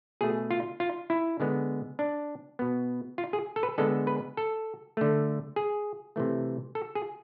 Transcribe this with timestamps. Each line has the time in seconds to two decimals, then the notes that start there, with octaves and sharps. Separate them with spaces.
0.21 B2 A3 G#4
0.51 F4
0.80 F4
1.10 E4
1.40 D3 G#3 B3
1.99 D4
2.59 B2 B3
3.18 F4
3.33 G#4
3.56 A4
3.63 B4
3.78 D3 G#3 B3 A4
4.07 B4
4.37 A4
4.97 D3 A3
5.56 G#4
6.16 C3 E3 A3
6.75 A4
6.95 G#4